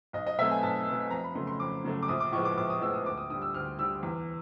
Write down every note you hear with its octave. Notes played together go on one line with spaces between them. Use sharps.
B1 D#5
D#5
B2 F#3 A3 C4 E5
G#5
B1 A5
B2 F#3 A3 C4
F2 A#5
B5
C#3 F#3 A3 C6
C6
F2 D6
C#3 F#3 A3
D6
A#1 D#6
D6
A2 F3 G#3 B3 C#6
D6
A#1 D6
D#6
A2 F3 G#3 B3 E6
D#6
D2 D6
D#6
D3 G3 D#6
E6
D2 F6
D3 G3 E6
E2